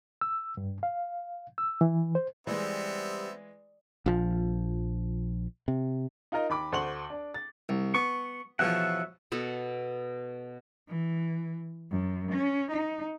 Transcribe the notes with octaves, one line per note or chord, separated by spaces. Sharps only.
E6
G2
F5
E6
E3
C5
E3 G3 G#3 B3 C4 E5
A#1 F3
C3
D#4 F4 A#4 D#5
D#2 B5 D6
D2 C5 F#5 C6 C#6 F#7
D4
A6
C2
B3 C#6
E2 B2 F3 C#5 E5 F#5
B2 B3 A4
E3
F#2
C#4
D#4